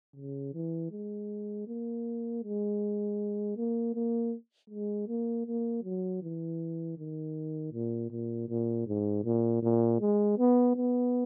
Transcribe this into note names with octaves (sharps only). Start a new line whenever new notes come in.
C#3
E3
G#3
A#3
G#3
A#3
A#3
G#3
A#3
A#3
F#3
E3
D#3
A#2
A#2
A#2
G#2
A#2
A#2
G#3
B3
B3